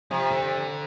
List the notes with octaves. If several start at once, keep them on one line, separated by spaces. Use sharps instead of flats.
C3 F3
D3